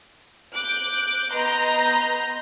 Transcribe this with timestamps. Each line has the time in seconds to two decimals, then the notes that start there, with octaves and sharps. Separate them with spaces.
0.55 D6 F#6 G6 D7
1.30 B3 B4 D#5 A#5 C6 G6